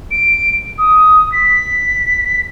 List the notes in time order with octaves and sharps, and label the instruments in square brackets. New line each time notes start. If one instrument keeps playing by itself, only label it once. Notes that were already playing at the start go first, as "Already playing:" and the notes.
[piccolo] D7
D#6
B6